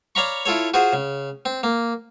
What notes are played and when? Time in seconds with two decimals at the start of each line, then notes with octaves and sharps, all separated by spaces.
0.15 C#5 D5 F5 A#5 B5 C#6
0.45 E4 F4 A4 C#5
0.74 F4 F#4 G#4 C5
0.93 C#3
1.45 C4
1.63 A#3